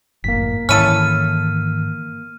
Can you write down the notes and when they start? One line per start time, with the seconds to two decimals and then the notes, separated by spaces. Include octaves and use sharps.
0.24 G1 F#2 A2 A#3 B6
0.69 G#2 D#3 E3 C#4 E4 A4 F6 D#7